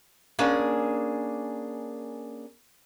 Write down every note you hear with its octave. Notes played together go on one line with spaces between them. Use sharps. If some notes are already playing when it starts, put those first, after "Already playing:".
A#3 C#4 D4 G#4